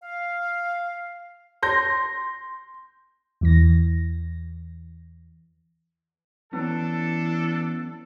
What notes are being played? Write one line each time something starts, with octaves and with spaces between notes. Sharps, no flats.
F5
C6 G6 A#6
E2 E3 A#6
E3 F#3 B3 C#4 D4 A4